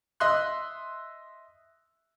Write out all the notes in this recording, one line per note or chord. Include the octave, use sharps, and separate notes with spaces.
D#5 E5 C6 F#6